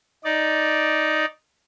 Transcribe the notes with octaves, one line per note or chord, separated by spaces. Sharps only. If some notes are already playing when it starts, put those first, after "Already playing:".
D#4 D5